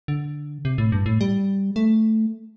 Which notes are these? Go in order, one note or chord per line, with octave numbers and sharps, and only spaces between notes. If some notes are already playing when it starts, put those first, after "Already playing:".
D3
C3
A2
G2
A2
G3
A3